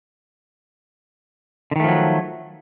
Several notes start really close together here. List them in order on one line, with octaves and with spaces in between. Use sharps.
D3 D#3 A3 F3 F#3